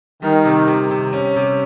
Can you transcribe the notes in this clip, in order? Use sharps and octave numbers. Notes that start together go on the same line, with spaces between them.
D#3 G3
C3
C3
C3
C#4
C3